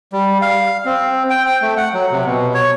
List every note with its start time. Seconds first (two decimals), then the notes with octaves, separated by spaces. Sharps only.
0.13 G3
0.42 F5
0.85 C4
1.30 G5
1.46 G5
1.62 A3
1.77 F#5
1.93 F#3
2.12 C3
2.25 B2
2.54 C#5